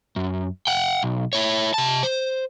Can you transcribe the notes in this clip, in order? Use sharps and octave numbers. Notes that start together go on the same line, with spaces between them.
F#2
F#5 G5
B1
E4 C#5
C3 A5
C5